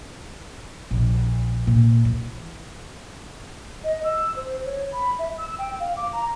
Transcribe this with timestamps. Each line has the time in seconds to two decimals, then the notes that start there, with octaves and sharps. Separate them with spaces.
0.91 A#1
1.67 A#2
2.05 E3
3.84 D#5
4.04 E6
4.36 C5
4.66 C#5
4.93 B5
5.19 E5
5.38 E6
5.59 G5
5.80 F5
5.97 D6
6.13 A#5